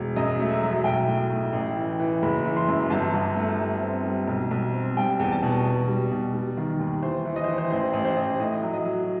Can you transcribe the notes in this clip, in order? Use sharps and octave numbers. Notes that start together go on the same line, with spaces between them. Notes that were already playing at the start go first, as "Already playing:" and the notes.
Already playing: E1
F#2 D#5
A3
E5
F#3
B1 G5
A2
A2
A1
E3
E3
F#1 B5
E3
C6
F#2
G1 A5
G1
A3
G3
C4
G3
B1
B1
C4
G3 G5
E2
A5
B2
B2
G3
B2
G3
D#3
D#2
E3 C5
E3
D#5
C5
E3
C5
A1 C5
A1
C5
A1
A2 D#5
F#3
D#5
F#3